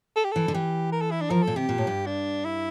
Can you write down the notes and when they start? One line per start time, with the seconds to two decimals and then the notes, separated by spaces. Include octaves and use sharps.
0.16 A4
0.24 G4
0.31 E3 A4
0.48 D3
0.54 E3 G4
0.92 A#4
1.01 A4
1.11 E4
1.21 D4
1.30 F3 A#4
1.43 A#2 A4
1.56 C3 G4
1.69 A#2
1.78 A2
1.87 G2
2.06 D4
2.45 E4